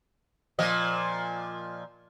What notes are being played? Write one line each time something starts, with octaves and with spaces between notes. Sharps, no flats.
A#2 F3 D#5